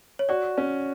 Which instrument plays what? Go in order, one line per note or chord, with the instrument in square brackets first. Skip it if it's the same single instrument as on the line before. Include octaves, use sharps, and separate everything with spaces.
[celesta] C#5
[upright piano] F#4 [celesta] D5
[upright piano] C#4